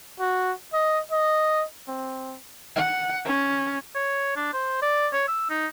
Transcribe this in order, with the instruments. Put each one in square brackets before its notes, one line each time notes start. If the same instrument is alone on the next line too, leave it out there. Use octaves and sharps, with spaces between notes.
[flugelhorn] F#4
D#5
D#5
C4
[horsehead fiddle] F#5
C#4
[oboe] C#5
D4
C5
D5
C#5
E6
D#4